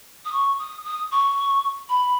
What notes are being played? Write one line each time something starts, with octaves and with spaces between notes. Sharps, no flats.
D#6
C#6
D#6
D#6
C#6
B5